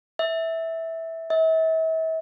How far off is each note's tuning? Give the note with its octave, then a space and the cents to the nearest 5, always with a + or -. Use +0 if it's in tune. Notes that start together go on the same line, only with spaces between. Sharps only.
E5 -10
E5 -40